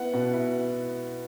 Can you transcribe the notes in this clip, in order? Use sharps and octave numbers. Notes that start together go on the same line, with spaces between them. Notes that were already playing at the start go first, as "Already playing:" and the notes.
Already playing: B3 E4 F#5
B2
E4